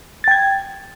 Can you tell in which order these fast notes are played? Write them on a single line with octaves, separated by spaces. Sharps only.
A6 G5 G#6